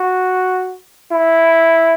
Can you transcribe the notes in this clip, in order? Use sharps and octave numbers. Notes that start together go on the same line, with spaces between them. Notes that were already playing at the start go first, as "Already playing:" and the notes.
Already playing: F#4
E4